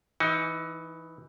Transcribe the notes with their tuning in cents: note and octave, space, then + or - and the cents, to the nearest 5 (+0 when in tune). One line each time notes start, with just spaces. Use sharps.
E3 +0 D#4 +25